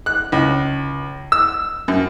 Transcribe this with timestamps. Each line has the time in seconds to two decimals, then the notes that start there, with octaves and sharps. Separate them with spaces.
0.06 F#6
0.32 C#2
1.32 E6
1.88 F#2